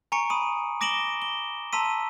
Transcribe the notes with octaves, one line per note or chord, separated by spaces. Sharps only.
G#5 A#5 C#6 C#7 D7
B5 D#6 D#7
D6 A#6 D7 E7 F#7 G7
G7
A5 A#5 C6 E6 B6 D#7